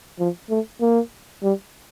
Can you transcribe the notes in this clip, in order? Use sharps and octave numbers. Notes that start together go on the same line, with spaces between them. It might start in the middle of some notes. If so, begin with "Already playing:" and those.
F3
A3
A#3
G3